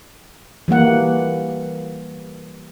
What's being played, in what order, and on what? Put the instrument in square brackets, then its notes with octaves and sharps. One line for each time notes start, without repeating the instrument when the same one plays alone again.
[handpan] E3 G3 A#3 F#5